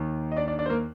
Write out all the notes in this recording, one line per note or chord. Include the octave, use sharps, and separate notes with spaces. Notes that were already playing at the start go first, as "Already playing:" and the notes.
Already playing: D#2 D#3
D#5
D4 D5
D4 D5
D4 D5
C5
A#3 A#4